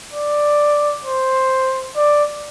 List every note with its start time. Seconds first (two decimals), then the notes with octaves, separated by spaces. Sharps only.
0.13 D5
1.05 C5
1.97 D5